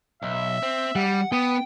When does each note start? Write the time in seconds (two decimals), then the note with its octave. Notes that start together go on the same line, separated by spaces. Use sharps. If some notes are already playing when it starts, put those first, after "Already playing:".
0.23 B1 E5
0.63 C4
0.95 G3 F#5
1.32 B3 G5 D#6